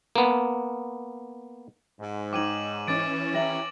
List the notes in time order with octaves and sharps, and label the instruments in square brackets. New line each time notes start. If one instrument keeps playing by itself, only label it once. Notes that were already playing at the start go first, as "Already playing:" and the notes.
[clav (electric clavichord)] A#3 B3
[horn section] G#2
[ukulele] D#4 C#5 G5 [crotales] D6 D#7 F#7
[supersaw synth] E3 C#4 [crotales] D6 A6 D7
[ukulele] G4 E5 A#5 [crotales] A6 A#6 F#7